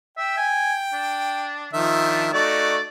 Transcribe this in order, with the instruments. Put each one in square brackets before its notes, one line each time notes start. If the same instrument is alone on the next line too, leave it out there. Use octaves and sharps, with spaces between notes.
[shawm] E5 [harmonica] G5
[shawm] G#5
D4
[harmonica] D#3 F3 E5
[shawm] D4
[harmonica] A3 D#4 F#4 [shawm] D5